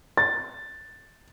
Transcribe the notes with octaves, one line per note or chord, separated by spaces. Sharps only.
A6